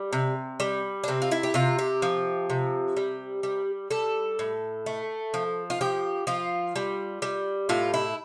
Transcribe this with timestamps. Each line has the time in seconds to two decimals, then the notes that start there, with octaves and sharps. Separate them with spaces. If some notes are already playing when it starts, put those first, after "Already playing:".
Already playing: G3
0.13 C3
0.60 G3
1.04 D4
1.08 C3 C4
1.22 F4
1.31 E4
1.43 G4
1.54 C3 F4
1.79 G4
2.02 F3
2.50 C3
2.97 G3
3.43 G3
3.91 G3 A4
4.39 A2
4.86 A3
5.34 F3
5.70 F4
5.81 F3 G4
6.27 F3 F4
6.75 G3
7.22 G3
7.69 A2 F4
7.94 E4